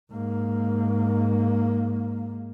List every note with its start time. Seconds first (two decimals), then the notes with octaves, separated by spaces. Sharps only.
0.11 G#2 A#3